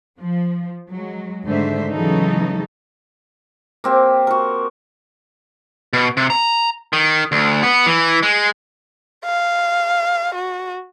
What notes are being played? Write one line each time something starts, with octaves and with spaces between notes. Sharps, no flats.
F3
F#3 G#3
G#2 D3 D#3 A3 C5 E5
C#3 E3 F#3 G#3 D#4 A4
A#3 C4 G4
F#4 A#4
B2
C3
A#5
D#3
D2
B3
E3
G#3
F5
F#4